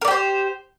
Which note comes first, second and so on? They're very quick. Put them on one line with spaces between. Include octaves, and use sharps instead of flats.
A#4 D5 G4 C5